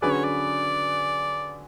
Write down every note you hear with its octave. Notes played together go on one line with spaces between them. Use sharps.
D3 F#3 C#4 G#4 B4 D5
C#5
D5